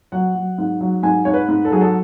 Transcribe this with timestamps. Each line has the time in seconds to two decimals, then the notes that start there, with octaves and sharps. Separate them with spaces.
0.12 F#3 F#5
0.35 F#3
0.58 G#2
0.81 F#3
1.03 G#2 G#5
1.25 G#2 C#5
1.34 B4
1.49 G#2
1.65 A4
1.72 F#3 G#4
1.81 A4